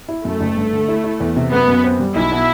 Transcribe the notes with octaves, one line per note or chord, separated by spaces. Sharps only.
E4
F#2 A3
F#1
G2
D3
E4
E4
E2
C3
F#2 B3
F#2
C4
G3
B1 E4
B2